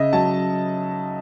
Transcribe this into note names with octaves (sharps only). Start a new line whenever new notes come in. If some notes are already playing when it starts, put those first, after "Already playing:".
Already playing: C#3 D#5 E5
F#3 A5